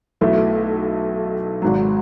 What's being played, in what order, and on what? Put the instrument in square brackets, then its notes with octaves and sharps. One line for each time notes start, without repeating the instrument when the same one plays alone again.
[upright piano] B1 B2 A3 E4
G#1 G#2 F#3